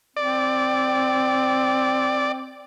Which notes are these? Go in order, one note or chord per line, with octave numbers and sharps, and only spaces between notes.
C4 D5